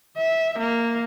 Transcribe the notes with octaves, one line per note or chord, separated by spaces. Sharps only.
E5
A#3